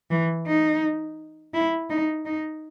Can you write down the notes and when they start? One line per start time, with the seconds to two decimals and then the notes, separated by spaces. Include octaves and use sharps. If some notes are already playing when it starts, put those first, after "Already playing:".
0.10 E3
0.47 D#4
1.54 E4
1.90 D#4
2.25 D#4